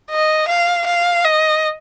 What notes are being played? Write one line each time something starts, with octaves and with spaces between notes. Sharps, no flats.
D#5
F5
F5
D#5